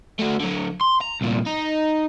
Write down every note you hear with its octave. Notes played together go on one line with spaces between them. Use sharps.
A3 F#4
D3 F#3
C6
A#5
C2 A#2
D#4